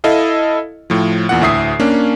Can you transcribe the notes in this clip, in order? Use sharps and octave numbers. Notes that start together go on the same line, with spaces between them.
E4 A4 D#5 F5
A2 F3
E2 A#2 F#5
D2 A2 E5 D#6 C7
A#3 C#4 D4